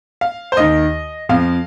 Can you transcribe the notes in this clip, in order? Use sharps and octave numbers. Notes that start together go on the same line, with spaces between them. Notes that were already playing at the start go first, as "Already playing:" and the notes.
F5
C5
D#2 D#3 D#5
F2 F3 F5